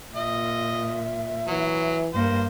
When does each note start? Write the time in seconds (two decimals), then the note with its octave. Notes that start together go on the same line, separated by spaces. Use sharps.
0.15 A#2 D#5 E5
1.47 E3 F#3
2.13 G2 A#3 C5